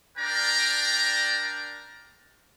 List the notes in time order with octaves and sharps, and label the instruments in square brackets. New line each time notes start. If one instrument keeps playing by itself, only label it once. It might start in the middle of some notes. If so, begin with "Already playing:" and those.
[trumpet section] D4 A#4 D5 G5 A#5